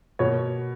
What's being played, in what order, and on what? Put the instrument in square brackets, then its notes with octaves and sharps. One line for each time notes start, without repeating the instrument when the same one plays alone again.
[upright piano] B2 A#3 C#5